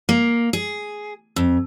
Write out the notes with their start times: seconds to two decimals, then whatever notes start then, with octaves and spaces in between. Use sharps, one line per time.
0.09 A#3
0.53 G#4
1.36 F2